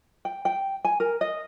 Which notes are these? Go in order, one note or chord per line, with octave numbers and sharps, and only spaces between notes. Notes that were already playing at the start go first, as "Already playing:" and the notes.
G5
G5
G#5
A#4
D#5